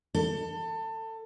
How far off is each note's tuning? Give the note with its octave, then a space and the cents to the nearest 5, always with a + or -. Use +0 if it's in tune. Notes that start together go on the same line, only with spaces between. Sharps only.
A4 +25